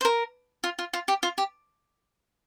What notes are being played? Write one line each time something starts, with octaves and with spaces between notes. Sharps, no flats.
C5
A#4
F4
F4
F4
G4
F4
G4